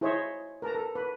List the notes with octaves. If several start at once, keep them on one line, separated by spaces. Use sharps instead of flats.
E4 G#4 C5 C#5 D#5 E5
A#4 B4 A5 A#5
A4
B4